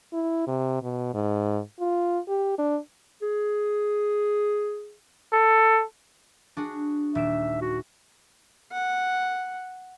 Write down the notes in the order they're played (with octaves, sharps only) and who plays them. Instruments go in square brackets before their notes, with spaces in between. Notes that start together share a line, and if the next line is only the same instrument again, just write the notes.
[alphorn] E4
C3
B2
G#2
F4
G4
D4
[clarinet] G#4
[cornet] A4
[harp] D4 F#4 G#4
[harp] D#1 D7 E7 [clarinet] E5
[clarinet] F#4
[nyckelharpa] F#5